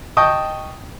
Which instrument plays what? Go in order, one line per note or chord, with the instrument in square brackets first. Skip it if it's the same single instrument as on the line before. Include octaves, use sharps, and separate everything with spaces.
[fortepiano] D#5 G5 A5 C#6 D#6